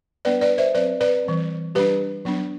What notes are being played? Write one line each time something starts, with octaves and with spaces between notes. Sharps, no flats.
G3 B3 D4 B4 D5
B4 D5
C5 E5
F#3 C4 B4 D5
B4 D5
E3 G3 C4
G3 D4 G4 B4
F#3 B3 D4